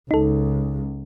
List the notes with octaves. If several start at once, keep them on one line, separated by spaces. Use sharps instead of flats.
C#2 D#4 A4